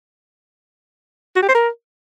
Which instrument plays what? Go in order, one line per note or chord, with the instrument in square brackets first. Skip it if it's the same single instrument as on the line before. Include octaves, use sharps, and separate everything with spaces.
[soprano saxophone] F#4
G4
C5
A#4